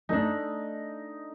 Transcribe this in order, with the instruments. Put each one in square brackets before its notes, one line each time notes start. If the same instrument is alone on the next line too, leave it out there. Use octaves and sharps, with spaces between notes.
[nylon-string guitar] A3 D4 [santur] D#4